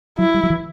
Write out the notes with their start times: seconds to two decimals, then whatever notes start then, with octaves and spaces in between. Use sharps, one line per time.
0.19 F#3 E4
0.34 G3
0.43 F#3
0.50 E3